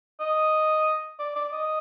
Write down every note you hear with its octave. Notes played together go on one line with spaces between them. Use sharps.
D#5
D5
D5
D#5